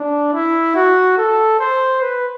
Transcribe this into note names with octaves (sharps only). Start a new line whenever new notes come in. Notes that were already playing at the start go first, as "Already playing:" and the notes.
Already playing: D4
E4
F#4
A4
C5
B4